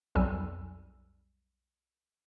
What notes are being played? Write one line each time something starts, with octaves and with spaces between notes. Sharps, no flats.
B1 F2 G3 G#5 E6